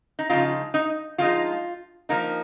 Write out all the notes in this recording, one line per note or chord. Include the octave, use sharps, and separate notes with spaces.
D#4
C#3 F3 G#3 D#4 F4
D#4
F3 G#3 D#4 F4
F3 A#3 D#4